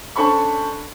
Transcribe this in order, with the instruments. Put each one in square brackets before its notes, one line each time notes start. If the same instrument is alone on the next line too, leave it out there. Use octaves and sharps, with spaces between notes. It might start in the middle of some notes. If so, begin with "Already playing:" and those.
[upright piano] C#4 D4 A4 C5 B5 C#6